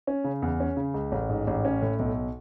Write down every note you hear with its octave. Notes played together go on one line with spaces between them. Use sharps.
C#4
C#3
E2
C#4
C#3
C#2
A1
G#2
A1
C#4
A2
B1